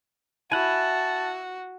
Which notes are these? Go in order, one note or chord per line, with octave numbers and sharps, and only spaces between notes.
E4 F#4 E5 F#5 G#5 A5